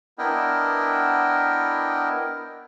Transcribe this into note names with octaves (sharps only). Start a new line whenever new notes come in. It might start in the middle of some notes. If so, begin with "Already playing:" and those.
B3 D4 E4 A#4 D#5 G5